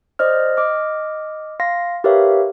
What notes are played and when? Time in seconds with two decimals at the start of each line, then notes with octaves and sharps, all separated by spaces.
0.19 C5 D5 D#5 F6
0.57 D#5 D6 F6
1.60 F5 C6 A#6
2.04 G4 A#4 B4 C#5 E5 F5